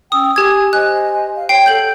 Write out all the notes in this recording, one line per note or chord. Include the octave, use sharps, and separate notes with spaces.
C#4 G5 D#6 E6
G4 G#5 G#6
C5 D#5 G#5 F#6
F5
C#5 G5 C7
A4 F#5 G6 F#7